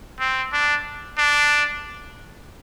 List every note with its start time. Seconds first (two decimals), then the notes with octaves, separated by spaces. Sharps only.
0.20 C4
0.53 D4
1.18 D4